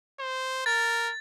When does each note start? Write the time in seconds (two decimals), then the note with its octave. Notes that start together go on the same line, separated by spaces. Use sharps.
0.20 C5
0.66 A#4 A6